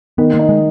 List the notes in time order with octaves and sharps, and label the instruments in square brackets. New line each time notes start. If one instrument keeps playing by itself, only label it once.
[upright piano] D#3 [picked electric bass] B3
[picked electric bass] A#3
[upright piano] D#4
[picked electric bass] G#3